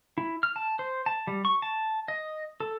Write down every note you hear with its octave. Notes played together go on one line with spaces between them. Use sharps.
E4
F6
A5
C5
A5
G3
C#6
A5
D#5
A4